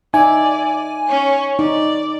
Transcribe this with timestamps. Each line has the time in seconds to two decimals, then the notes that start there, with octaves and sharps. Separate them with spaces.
0.14 D#4 D5 E5 G#5
1.07 C#4 C#5
1.59 D#4 D5